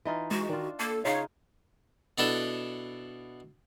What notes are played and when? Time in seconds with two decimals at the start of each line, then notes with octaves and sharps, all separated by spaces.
0.05 E3 D#4 F4
0.31 G#3 F#4
0.49 D#3 D4 F4
0.79 A#3 A4
1.05 C#3 D#4 F4 C#5 F5
2.18 B2 B3 D4 E4 A4